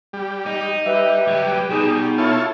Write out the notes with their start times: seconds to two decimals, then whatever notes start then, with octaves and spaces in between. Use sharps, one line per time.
0.13 G3
0.46 D#4
0.86 G3 B4 E5
1.28 F#3 G4
1.71 B2 D#4 G#4
2.18 E4 F4 A4 C#5